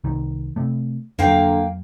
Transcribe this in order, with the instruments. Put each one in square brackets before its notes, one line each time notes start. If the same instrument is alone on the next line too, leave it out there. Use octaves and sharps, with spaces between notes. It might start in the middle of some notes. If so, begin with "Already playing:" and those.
[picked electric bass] C2 D#3
C3 A3
[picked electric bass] F2 F#3 [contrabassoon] D3 [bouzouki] A#3 F5 G5